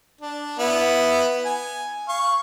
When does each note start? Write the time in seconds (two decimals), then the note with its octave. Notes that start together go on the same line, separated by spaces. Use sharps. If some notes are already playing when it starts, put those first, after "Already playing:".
0.21 D4
0.59 B3 E4
1.45 G#5
2.08 F5 C#6